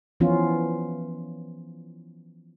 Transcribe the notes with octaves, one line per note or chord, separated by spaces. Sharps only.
E3 F3 B3 C#4 F4